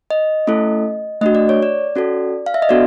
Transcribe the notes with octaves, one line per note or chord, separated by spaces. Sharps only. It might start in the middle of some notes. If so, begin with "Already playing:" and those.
D#5
A3 C#4 E4 A4
A3 D4 F#4 D#5
D5
C#5
D5
C#4 F#4 A4
F5
E5
D#5
B3 D4 F#4 A4 D5